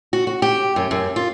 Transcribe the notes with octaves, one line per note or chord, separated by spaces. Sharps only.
F#4
F#4
G4
F#2
F#2
F4